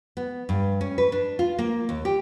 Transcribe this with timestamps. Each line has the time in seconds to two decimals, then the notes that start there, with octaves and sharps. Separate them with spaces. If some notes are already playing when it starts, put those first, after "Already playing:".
0.17 B3
0.49 G2
0.81 C#4
0.98 B4
1.12 D4
1.39 F4
1.59 A#3
1.89 D#2
2.05 G4